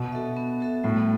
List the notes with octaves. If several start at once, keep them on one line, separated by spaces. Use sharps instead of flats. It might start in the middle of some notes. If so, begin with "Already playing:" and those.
Already playing: B2 B3
F#4 A4 E5
B3
F#4 A4 E5
A2 G3